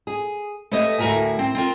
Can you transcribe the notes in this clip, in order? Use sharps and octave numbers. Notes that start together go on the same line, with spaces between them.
G#4
A3 G4 B4 C#5 D#5
D2 A2 F#4 A#4 E5 G#5
C4
C4 F4 A#4